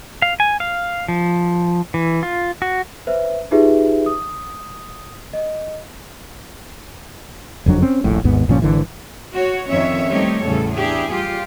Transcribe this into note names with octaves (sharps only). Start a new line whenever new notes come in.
F5
G#5
F5
F3
E3
F4
F#4
B4 C5 E5
D#4 F4 G4 G#4 B4 E5
D#6
D#5
F#1 F2 F#3 D4
C4 C#4
D#1 A#1 A2
G#1 D#2 G#2 B3
G1 A#2 F3 C#4
G#1 D3 E3
F#4 C#5
F2 D#3 C#4 C#5 E5
G3 A3 C4 D#4 G4 C#5
E2 A2 C#3 G3 A4
D4 E4 G4 G#4
G3 F4 G4